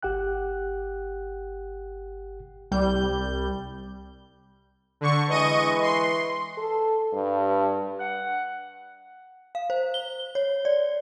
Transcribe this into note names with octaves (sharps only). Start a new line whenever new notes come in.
G1 G4 F#5 G5 F#6
C2 G3 G6
D3 C#6
E3 G#3 B4 D#5 C#6 D#7
C6
A4
G2
F#5
F5
C5
G7
C#5
D5